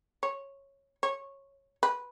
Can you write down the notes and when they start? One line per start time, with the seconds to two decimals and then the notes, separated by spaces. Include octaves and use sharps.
0.23 C#5
1.03 C#5
1.83 B4